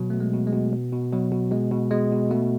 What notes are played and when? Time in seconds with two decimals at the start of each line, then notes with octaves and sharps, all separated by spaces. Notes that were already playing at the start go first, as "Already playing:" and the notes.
Already playing: B2 F#3
0.10 B2 A3
0.20 G#3
0.34 B2
0.47 G#3
0.53 B2
0.73 B2
0.92 B2
1.12 B2 F#3
1.32 B2
1.52 B2 G#3
1.72 B2
1.91 B2 G#3
2.12 B2
2.31 B2 A3